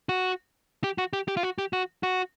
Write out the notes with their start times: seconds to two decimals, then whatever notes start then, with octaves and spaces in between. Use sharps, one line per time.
0.09 F#4
0.84 G4
0.98 F#4
1.13 G4
1.28 G4
1.37 F4
1.43 F#4
1.58 G4
1.73 F#4
2.03 F#4